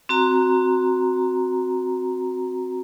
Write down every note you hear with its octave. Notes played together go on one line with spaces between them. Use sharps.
C4 F#4 A#5